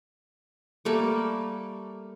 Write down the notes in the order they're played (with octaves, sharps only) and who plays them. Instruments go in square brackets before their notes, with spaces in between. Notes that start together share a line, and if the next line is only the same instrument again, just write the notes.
[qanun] G3 A3 A#3